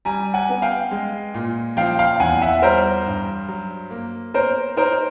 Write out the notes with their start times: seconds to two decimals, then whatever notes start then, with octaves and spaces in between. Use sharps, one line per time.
0.05 G3 G#5 A#5
0.34 F#5 G#5
0.49 B3
0.62 F5 G5
0.91 G#3
1.34 A#2
1.77 F3 F5 G5
1.99 F5 G5
2.20 E2 F#5 G#5
2.42 E5 F#5
2.62 G3 A#4 C5
3.06 G2
3.48 F#3
3.91 A#3
4.34 B3 A#4 C5
4.77 D#4 A#4 C5